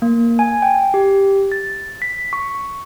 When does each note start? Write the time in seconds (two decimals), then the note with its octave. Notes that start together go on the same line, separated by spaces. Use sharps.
0.02 A#3
0.39 G#5
0.62 G5
0.94 G4
1.52 A6
2.02 B6
2.33 C#6